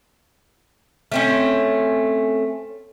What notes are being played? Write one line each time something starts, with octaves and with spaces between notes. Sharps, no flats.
A3 C4 C#4